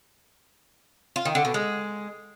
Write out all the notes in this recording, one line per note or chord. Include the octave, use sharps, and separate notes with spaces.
F4
D#3
D3
B2
G#3